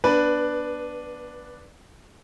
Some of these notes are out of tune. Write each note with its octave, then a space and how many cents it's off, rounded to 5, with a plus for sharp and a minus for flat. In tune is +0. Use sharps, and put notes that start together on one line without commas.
B3 -25 D4 +0 B4 +0